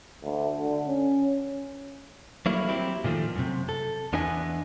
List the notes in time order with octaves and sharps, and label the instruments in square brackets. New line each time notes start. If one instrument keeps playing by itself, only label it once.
[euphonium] D2
D3
C#4
[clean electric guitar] F#3 G3 A3 A#3 E4
F#3 C4 E4 G4
A#2 D#3 F3 A3
F#2 C3
A4
E2 B3 D4 E4 D#5 G#5